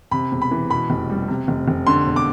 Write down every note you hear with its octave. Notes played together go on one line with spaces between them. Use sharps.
C3 B5
E1
B5
E3
B2 B5
F1
G3
C3
F1
F1
D3 C6
E1
D6